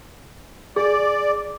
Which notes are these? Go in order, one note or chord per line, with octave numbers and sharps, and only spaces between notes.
G#4 D5